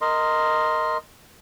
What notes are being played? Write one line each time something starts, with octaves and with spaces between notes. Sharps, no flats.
A#4 D#5 C6